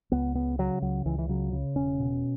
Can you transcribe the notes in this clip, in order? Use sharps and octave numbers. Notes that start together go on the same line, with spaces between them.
C#2 B3
C#3 B3
C#3 F#3
C#2 F#3
C#2 E3
E3
C#3 F#3
C#3
E1 C#4
B2